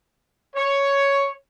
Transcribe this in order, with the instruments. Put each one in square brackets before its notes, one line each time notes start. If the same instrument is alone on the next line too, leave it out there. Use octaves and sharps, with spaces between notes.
[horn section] C#5